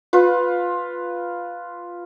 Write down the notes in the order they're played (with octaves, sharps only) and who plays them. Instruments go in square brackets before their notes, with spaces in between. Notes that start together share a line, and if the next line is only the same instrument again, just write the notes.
[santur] F4 B4